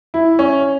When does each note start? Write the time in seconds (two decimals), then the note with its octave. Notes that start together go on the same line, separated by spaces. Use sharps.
0.14 E4
0.39 C#4